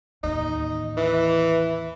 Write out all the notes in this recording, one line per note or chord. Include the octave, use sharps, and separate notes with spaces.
A1 D#2 D#4
E3